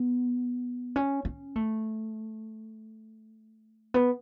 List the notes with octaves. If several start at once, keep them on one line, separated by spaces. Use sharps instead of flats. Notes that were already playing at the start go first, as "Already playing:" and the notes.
Already playing: B3
C#4
C#4
A3
B3